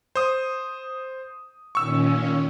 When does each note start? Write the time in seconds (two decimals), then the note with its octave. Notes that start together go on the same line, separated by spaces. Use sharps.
0.15 C5 D#6
1.75 A#2 D#3 C#4 C#6 E6